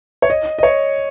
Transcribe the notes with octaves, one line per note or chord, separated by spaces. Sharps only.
C#5
D#5
D#5
C#5